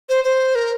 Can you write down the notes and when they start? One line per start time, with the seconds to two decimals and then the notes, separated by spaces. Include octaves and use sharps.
0.09 C5
0.24 C5
0.55 A#4